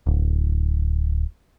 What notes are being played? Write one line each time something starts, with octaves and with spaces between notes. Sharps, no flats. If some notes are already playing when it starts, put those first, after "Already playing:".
D1